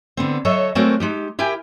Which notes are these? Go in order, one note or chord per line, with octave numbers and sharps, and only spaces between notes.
D3 B3 C4
F#3 A4 C#5 D#5 E5
F#3 G#3 A3 C4 F#4 A#4
G#3 D#4 G4
E4 G4 A#4 G5 G#5